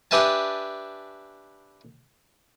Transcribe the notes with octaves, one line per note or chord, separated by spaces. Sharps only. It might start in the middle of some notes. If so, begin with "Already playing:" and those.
D4 G4 B4 E5 G#5 A5